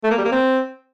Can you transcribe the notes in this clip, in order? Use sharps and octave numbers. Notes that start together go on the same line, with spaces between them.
A3
A#3
G3
A#3
C4